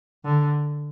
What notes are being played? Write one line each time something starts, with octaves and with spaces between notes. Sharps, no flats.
D3